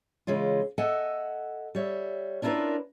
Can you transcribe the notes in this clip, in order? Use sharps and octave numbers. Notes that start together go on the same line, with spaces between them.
C#3 E3 G#3 C#4 F4
A4 D#5 E5 F#5 G#5
G3 C#5 E5
C#4 D4 E4 F4 A#4 B4